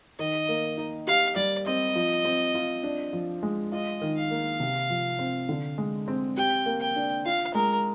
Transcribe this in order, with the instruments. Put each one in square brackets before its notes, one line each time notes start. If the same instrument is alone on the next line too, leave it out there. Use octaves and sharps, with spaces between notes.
[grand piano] D#3 [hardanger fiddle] D#5
[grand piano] A#3
D#4
[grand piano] G4 [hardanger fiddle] F5
[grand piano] G3 [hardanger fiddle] D5
[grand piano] C4 [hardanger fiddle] D#5
[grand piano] F3
C4
F4
D4
F3
G#3
[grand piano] F4 [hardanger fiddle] D#5
[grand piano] D#3
[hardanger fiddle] F5
[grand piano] A#3
C3
F3
C4
D3
G#3
C4
[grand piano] G4 [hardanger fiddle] G5
[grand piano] A#3
[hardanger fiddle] G5
[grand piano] D4
[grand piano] F4 [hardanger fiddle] F5
[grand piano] G#3 [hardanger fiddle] A#4